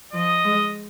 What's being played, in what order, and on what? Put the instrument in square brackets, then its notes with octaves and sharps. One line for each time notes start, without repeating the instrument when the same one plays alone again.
[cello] F3 [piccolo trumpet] D#5
[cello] G#3